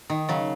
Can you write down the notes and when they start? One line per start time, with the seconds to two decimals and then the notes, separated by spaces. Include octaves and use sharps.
0.10 D#3
0.29 C#3 F#3